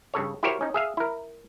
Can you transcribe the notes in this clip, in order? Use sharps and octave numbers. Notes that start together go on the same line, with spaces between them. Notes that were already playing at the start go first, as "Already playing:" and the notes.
G2 C#3 A4 C#5
E4 F#4 G4 A#4 C5 C#5
C#4 D#4
G#4 E5 F5
E4 A#4